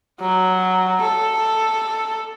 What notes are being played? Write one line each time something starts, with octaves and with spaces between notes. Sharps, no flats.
F#3
A4